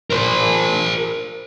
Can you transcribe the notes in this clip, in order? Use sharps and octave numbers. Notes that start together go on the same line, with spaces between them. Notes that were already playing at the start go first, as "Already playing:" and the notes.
A#4 C5